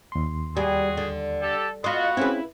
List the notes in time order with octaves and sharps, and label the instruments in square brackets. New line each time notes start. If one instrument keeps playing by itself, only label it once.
[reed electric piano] D#2 C6
[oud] G3 [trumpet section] F#4 G#4
[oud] D3
[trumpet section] G4 A4
[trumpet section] B3 F#4 [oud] F4 D#5 [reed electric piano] B5 C6
[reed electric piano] C4 C#4 G#4 [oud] E4 B4